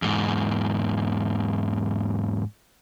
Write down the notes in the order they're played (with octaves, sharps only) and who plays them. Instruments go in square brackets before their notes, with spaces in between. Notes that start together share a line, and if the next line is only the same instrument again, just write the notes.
[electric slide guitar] E2 G#2